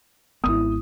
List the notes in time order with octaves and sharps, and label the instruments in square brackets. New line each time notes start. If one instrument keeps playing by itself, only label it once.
[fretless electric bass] G#1 B3 [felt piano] E4 D#6